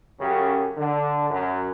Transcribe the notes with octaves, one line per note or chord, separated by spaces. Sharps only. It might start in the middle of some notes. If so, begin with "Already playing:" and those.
F#2 C#3 G4
D3
F#2